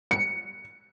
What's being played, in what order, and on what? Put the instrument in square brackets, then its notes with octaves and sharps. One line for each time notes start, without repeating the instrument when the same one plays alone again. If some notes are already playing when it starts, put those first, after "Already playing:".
[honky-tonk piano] C#7